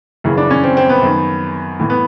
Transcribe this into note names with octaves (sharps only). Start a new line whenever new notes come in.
F#2 C#3 E3
D4
C#4
C4
C4
B3
F#2 D#3
A2 E3
B3